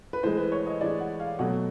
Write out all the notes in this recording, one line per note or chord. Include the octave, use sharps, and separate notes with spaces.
B4
A2 E3 G#3 C5
B4
C#5
D#5
A2 E3 G#3 D5
F#5
F5
B2 F#3 A3 F#5